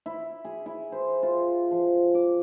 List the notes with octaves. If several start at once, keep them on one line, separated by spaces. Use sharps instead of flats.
E4
G#4
E4
C5
F4
F3
D6